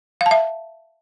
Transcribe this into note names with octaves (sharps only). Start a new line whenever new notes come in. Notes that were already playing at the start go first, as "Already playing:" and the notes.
F5
A5
E5